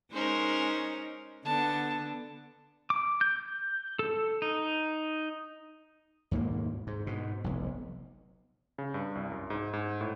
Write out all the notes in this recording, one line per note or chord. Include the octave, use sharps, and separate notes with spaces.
G#3 C#4 D#4 A#4 C5
D3 B3 D4 A5
D6
G6
A4
D#4
D#2 G#2 B2 A#3
G#2
G#2 B2
F1 B1
C#3
G2
C2
F#2
G#2
G#2
A2